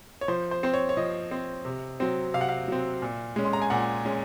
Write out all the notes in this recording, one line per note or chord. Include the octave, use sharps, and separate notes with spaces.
C#5
F3 C5
C5
C4 C5
C#5
C#5
F3 D#5
C4
C3
F#3 C4
C3 F5
F#5
F5
F#3 C4
A#2
G#3 C#4
C6
A#5
G#5
A#2 F#5
G#3 C#4